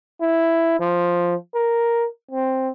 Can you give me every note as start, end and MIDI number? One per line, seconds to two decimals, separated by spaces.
0.21 0.78 64
0.80 1.35 53
1.54 2.06 70
2.31 2.70 60